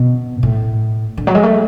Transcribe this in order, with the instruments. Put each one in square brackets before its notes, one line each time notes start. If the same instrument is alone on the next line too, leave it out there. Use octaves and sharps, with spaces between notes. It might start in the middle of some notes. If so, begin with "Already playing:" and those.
Already playing: [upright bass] B2
A2
D3
F#3
G#3
A3